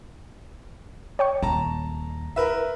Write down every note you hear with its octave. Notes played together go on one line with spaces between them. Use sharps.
C#5 G5 C#6
D#1 A5 A#5
A#4 B4 E5